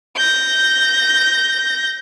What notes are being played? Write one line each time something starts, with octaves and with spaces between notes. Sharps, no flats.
G6 A#6